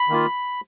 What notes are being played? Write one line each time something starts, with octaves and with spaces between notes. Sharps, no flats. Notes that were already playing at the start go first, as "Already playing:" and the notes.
Already playing: B5
D#3 A#3 F4